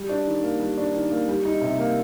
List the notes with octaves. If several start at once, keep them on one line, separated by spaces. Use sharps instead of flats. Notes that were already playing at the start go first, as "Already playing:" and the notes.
Already playing: G3
D4
D#3
A#3
G3
D4
D#3
A#3
G3
D#4
C3
A#3